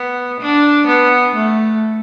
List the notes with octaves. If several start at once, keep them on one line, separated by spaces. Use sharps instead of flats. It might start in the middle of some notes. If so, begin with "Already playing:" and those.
Already playing: B3
D4
B3
A3